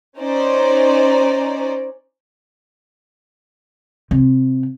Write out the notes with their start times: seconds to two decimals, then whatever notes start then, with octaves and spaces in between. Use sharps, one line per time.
0.20 C#4 D#4 C5 D5
4.11 C3